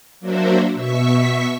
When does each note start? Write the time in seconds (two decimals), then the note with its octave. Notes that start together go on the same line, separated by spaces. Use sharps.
0.20 F#3 A#3 D4 F#4 C5 E5
0.74 B2 E5 C#6 B6